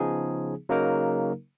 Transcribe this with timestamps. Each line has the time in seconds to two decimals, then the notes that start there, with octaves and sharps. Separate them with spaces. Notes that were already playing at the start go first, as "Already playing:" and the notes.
Already playing: C#3 F3 B3 D#4 G#4
0.69 C#3 F#3 A#3 D#4 A#4